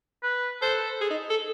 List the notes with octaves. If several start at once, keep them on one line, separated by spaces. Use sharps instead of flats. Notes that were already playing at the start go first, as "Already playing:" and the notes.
B4
A4 C5
G#4
D#4
A4